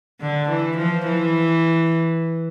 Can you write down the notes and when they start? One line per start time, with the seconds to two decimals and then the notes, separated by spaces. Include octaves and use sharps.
0.21 D3
0.50 E3
0.78 F3
1.06 E3